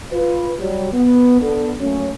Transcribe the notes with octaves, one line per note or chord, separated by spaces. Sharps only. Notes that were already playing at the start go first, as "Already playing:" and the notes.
F4 B4
F#3 G3
B3
D3 B3 A4
F#3 A3 A#3 C#4